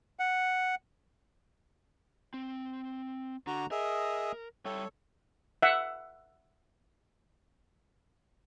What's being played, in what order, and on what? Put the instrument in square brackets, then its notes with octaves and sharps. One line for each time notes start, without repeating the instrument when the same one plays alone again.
[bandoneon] F#5
[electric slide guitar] C4
[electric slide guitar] D3 [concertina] F#4 A#5
[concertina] G#4 D#5 E5 [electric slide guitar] A#4
[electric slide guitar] G3 E5 G5 [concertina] A4 C#5
[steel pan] E5 F#5